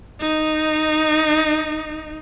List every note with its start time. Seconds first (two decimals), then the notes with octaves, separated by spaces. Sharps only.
0.21 D#4